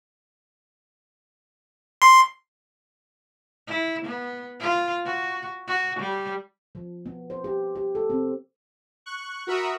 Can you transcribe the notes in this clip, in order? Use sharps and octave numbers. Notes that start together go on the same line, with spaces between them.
C6
E4
B3
F4
F#4
F#4
G3
F3
B3
C5
G4
G4
A4
C4
C#6 F#6
F#4 A#4 E5 B5 C#6 D#6